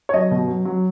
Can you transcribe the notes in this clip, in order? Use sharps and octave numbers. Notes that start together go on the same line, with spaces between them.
C#5
F#3 D#5
B2
F#3
F#3